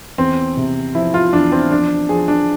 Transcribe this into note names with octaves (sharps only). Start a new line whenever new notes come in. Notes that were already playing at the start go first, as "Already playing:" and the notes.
E2 C4
C3
F3 E4
F4
E2 D4
C4
F3 D4
F3 G#4
D4